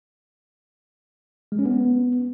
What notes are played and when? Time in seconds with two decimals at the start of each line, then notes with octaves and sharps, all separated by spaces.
1.52 G#3
1.59 C#4
1.66 B3